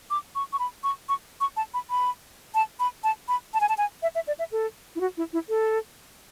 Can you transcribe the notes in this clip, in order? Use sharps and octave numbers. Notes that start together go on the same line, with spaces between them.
D6
C#6
C#6
B5
C#6
C#6
C#6
A5
B5
B5
A5
B5
A5
B5
A5
G#5
A5
G#5
E5
E5
D5
E5
A4
E4
F#4
E4
E4
A4